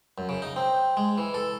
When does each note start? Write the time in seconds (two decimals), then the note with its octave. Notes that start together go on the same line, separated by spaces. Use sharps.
0.18 F#2
0.29 C#3
0.42 D#4
0.56 C4
0.97 G#3
1.18 E3
1.34 A4